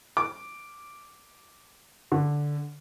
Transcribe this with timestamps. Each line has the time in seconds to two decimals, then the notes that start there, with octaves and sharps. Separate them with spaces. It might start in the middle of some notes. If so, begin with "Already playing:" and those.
0.17 D6
2.12 D3